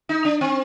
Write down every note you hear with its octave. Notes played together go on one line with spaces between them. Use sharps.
D#4
D4
C4